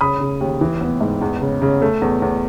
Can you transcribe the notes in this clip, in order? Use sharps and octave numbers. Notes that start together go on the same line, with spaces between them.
C#3 B5 D#6
C#3
D#2
E3
B3
G#2
E2
C#3
C#3
A3
E2
E2